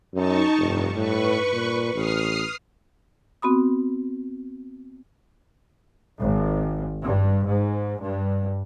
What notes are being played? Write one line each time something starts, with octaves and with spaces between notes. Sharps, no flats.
F#2 D#4 A5 C#6
F1 G2
A2 B4 C#6
A#2
A1 D#6 F6 C7
B3 C4 F#4 B5 D#6
G#1
G2
G#2
G2